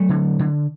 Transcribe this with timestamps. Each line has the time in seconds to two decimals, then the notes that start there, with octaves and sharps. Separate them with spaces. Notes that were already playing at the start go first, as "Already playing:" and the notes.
Already playing: F#3 A3
0.09 D3
0.39 D3